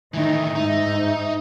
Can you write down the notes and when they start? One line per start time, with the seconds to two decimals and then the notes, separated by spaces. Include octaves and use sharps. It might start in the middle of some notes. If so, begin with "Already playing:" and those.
0.14 A2 D#3 E3 D#4 E5
0.56 G#2 D#4